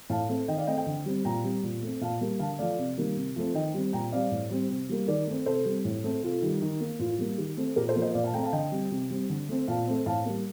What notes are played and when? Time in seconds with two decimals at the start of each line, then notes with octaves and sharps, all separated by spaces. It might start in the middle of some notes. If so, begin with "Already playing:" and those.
0.10 A2 F5 A5
0.29 A3 C4
0.48 D#3 D#5 G5
0.57 D5 F5
0.67 A3 C4 D#5 G5
0.77 D#5 G5
0.86 D3
1.06 G3 C4
1.25 A#2 G5 A#5
1.44 G3 C4
1.63 A#2
1.83 A3 C4
2.01 A#2 F5 A5
2.21 G3 A#3
2.39 D3 F5 A5
2.59 F3 A3 D5 F5
2.78 C3
2.98 D#3 G3 A#3
3.17 C3
3.36 F3 A3 C4
3.54 D#3 D#5 G5
3.74 G3 C4
3.93 A#2 G5 A#5
4.12 G3 C4 D5 F5
4.31 A2
4.50 G3 C4
4.69 C3
4.89 G3 A#3
5.08 D#3 A#4 D5
5.27 A3 C4
5.46 C3 A4 C5
5.65 G3 C4
5.85 A2
6.04 A3 C4
6.23 C3 F4 A4
6.42 D#3 G3
6.62 D#3
6.80 A#3
6.99 A2 F4
7.18 G3 A#3
7.38 D#3 G4
7.57 A3 C4
7.76 A#2 G4 A#4
7.89 A4 C5
7.95 F3 A#3
8.02 C5 D#5
8.14 A#2 D5 F5
8.24 F5 A5
8.33 A3 G5 A#5
8.36 C4
8.43 F5 A5
8.53 D3 D#5 G5
8.72 G3 C4
8.91 C3
9.10 G3 C4
9.30 D3
9.49 A3 C4
9.68 A#2 F5 A5
9.87 A3 C4
10.06 A2 F5 A5
10.25 G3 A#3